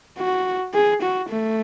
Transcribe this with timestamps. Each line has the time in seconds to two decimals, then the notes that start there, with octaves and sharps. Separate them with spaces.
0.18 F#4
0.74 G#4
1.02 F#4
1.30 A3